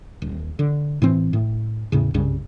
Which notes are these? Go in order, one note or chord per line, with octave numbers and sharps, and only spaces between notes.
D#1
D3
A2 E3 C4
A2
E2 A2 C#3
C2 G2 C#3